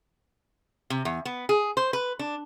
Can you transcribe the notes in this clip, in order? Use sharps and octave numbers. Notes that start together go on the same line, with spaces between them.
C3
E2
B3
G#4
C5
B4
D4